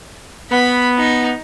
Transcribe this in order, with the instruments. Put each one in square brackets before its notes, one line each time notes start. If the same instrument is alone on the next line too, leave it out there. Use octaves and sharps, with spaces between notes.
[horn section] B3 [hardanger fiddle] B5
[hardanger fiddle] D#4